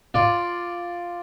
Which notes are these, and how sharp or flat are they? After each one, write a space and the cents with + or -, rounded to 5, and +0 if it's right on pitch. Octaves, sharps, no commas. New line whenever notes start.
F4 +0 D5 +0